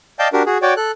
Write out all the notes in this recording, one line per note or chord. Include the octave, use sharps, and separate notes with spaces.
D5 D#5 F5 G5 A5 G6
D4 F#4 G4 A#4
F#4 G#4
F#4 C#5 D5 G5
A4 F#6